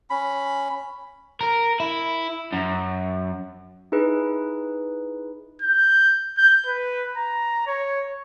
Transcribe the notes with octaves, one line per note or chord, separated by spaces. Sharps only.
C#4 B5
A#4
E4
F#2
D#4 E4 G#4 B4
G6
G6
B4
A#5
C#5